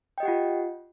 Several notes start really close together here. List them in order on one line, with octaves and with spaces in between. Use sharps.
G5 D#5 G4 F#5 F4